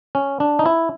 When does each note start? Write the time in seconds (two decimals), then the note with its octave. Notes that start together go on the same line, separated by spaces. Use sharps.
0.15 C#4
0.40 D4
0.59 D#4
0.66 E4